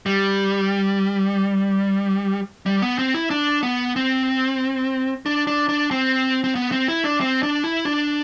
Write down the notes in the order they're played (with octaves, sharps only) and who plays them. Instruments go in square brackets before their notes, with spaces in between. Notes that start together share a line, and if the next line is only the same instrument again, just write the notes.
[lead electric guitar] G3
G3
B3
C4
E4
D4
B3
C4
D4
D4
D4
C4
C4
B3
C4
E4
D4
C4
D4
E4
D4